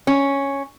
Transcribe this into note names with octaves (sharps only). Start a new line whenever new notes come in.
C#4